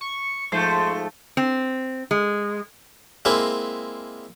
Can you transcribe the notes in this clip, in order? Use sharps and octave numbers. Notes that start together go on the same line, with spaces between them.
C#6
G#2 F3 A3 C5
C4
G#3
G#3 A#3 C4 E4